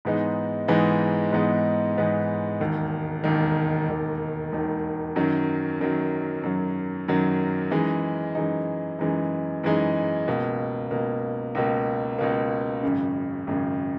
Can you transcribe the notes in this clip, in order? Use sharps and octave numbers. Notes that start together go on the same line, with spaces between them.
G#2 E3 G#3 B3 D#4
G#2 E3 G#3 B3 D#4
G#2 E3 G#3 B3 D#4
G#2 E3 G#3 B3 D#4
E1 D#2 D#3
E1 D#2 D#3
E1 D#2 D#3
E1 D#2 D#3
F#2 D#3 F#3
F#2 D#3 F#3
F#2 D#3 F#3
F#2 D#3 F#3
F#2 E3 G#3 D#4
F#2 E3 G#3 D#4
F#2 E3 G#3 D#4
F#2 E3 G#3 D#4
C#2 B2 A#3
C#2 B2 A#3
C#2 B2 A#3
C#2 B2 A#3
G#1 F#2 C#3
G#1 F#2 C#3